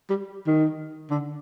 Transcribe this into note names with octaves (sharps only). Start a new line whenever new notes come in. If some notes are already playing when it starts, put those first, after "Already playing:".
G3
D#3
D3